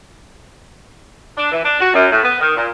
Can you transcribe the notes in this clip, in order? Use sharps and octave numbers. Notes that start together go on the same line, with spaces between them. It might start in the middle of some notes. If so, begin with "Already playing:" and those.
D4
E3
D4
F#4
F#2
A2
B3
D#3
A#2